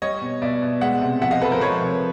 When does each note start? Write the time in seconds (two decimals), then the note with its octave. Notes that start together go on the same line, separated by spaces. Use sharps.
0.02 G3 C#5 D#5
0.21 B2
0.42 B2 D5 E5
0.62 B2
0.81 G#3 E5 F#5
1.01 C3
1.21 F3 E5 F#5
1.31 D#5 F5
1.41 F3 A4 B4
1.51 A#4 C5
1.61 F3 B4 C#5
1.81 C3